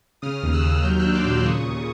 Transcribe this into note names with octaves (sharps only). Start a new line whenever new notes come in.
C#3 D#6 F6
D#2
E6 F#6
D#2
F#3 F6 G6
D4 E6 F#6
C6 D6
A#2 D6 E6
C#3 C#6 D#6
D#2